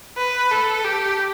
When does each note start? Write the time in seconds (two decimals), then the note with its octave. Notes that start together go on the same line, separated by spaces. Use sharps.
0.17 B4
0.51 A4
0.85 G4